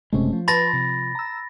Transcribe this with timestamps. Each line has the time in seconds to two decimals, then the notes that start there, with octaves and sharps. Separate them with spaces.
0.13 F#1 C3 G#3 A3 C#4
0.33 F3
0.48 B4 A5 B5 C6 A6 A#6
0.74 C3
1.15 A#5 E6